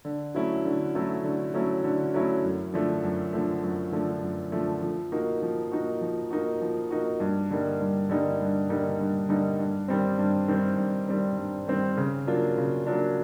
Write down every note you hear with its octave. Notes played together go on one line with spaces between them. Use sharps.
D3
F#3 A3 C#4 E4
D3
F#3 A3 C#4 E4
D3
F#3 A3 C#4 E4
D3
F#3 A3 C#4 E4
F#2
D3 F3 A3
F#2
D3 F3 A3
F#2
D3 F3 A3
F#2
D3 F3 A3
F3
A#3 D#4 F#4
F3
A#3 D#4 F#4
F3
A#3 D#4 F#4
F3
A#3 D#4 F#4
G2
D3 G3 A#3 D#4
G2
D3 G3 A#3 D#4
G2
D3 G3 A#3 D#4
G2
D3 G3 A#3 D#4
G2
D#3 G3 C4
G2
D#3 G3 C4
G2
D#3 G3 C4
G2
D#3 G3 C4
C#3
F#3 A#3 D4 F4
C#3
F#3 A#3 D4 F4